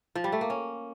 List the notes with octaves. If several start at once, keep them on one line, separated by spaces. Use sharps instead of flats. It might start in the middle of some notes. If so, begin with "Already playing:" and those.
F3
G3
A3
A#3
C#4